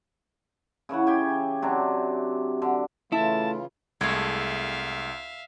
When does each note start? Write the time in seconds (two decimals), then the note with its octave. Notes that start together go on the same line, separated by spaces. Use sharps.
0.89 C#3 E3 C#5 F#5
1.07 G4 G5 G#5
1.62 C3 F#3 D4
2.62 D3
3.12 C#3 E3 A3 E4 F4 A5
4.01 C2 G#3 A3 E5 F5